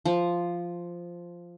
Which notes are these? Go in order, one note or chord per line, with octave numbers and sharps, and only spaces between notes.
F3